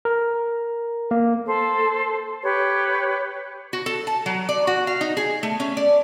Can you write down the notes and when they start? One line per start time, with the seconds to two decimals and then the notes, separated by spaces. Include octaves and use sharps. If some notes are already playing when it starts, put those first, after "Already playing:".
0.05 A#4
1.11 A#3
1.46 A4 C5
2.43 G4 B4 C#5
3.73 F#4
3.86 A4
4.07 A5
4.26 F#3
4.49 D5
4.67 F#4
4.87 F5
5.01 D#4
5.17 G#4
5.43 A3
5.60 C#4
5.77 D5